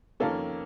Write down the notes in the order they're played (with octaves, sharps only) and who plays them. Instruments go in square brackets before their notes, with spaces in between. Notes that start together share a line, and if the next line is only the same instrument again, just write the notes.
[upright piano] F2 D#3 A#3 C#4 A4